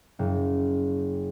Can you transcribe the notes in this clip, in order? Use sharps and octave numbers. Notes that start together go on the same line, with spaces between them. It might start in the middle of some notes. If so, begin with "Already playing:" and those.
F#1